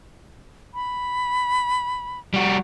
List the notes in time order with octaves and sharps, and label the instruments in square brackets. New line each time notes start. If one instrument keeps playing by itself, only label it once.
[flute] B5
[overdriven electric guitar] G3 F#4